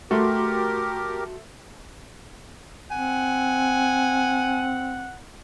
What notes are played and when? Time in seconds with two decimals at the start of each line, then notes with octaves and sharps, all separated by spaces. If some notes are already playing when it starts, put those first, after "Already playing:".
0.11 A3 F#4 G4 A#4 C6
2.91 C4 F#5 G#5